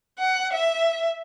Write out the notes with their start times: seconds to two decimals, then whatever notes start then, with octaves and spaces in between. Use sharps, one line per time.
0.18 F#5
0.53 E5